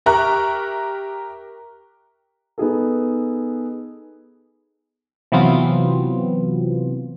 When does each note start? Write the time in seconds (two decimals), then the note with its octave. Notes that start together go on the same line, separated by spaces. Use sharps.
0.06 G4 A#4 E5 A#5 C#6 F#6
2.58 B3 D#4 G#4 A4
5.32 C3 E3 F#3 B3 C4 F4